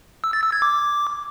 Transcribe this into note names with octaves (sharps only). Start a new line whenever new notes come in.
E6
A6
E6
G#6
D6